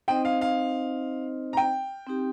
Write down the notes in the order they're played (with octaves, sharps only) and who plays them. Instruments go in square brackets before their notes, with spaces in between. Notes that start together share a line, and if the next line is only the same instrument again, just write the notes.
[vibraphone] C4 D#4 C5 D#5 [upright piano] G5
[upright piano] F5
F5
A#5
G5
[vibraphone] C4 D#4 G4